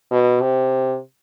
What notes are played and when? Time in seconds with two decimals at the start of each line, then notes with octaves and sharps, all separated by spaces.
0.11 B2
0.41 C3